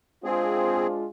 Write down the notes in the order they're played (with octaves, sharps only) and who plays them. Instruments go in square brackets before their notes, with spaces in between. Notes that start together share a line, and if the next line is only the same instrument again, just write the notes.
[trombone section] G#3 D4 F4 [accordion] C4 G#4 [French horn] C5